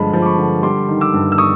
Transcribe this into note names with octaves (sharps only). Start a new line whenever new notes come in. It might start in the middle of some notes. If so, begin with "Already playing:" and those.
Already playing: G2 D3 F3 G#3 A5 B5
F3
D6
B5 C#6
D3
G3 C6 D6
D#3
D6 E6
G2
E6
C#6 D#6